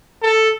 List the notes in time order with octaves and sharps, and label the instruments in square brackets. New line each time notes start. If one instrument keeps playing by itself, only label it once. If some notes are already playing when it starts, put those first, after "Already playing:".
[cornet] A4